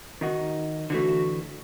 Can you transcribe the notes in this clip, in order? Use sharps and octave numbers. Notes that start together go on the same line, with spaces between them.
D#3 D#4 F#4
D3 E3 A3 F#4